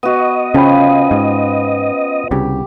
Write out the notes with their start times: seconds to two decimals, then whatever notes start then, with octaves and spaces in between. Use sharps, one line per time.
0.03 B3 F#4 D#5
0.54 C#3 F3 C#4 G5 B5
1.11 G#2
2.31 C2 C#3 G4